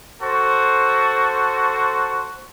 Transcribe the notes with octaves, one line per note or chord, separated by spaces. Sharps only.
F#4 A4 C5